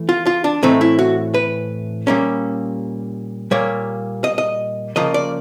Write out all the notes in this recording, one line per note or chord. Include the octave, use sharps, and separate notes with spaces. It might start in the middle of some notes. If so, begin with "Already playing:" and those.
Already playing: E3 A3
F4
F4
D4
A2 E3 A3 C4 D#4
E4
F#4
B4
A#2 G3 A#3 C#4
A#2 G3 A#3 C#5
D#5
D#5
C#3 F3 A#3 D#5
D5